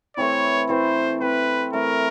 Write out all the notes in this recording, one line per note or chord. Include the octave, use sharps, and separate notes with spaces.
E3 A3 C4 E4 C#5
E3 A3 C4 E4 C5
E3 A3 C4 E4 B4
E3 A3 C4 E4 A#4